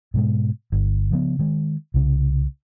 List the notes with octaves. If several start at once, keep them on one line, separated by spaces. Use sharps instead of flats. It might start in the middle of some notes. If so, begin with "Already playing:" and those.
G#2 B2 G#3
G1
C#3 F3 A#3 B3
D#3 G#3
C2 C#3